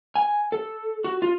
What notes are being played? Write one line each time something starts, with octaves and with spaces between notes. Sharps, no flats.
G#5
A4
F#4
F4